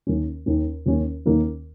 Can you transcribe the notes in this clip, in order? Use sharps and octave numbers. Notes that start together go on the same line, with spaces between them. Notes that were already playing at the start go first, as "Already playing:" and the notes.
D#2 D#3 A#3 C#4
D#2 D#3 A#3 C#4
D#2 D#3 A#3 C#4
D#2 D#3 A#3 C#4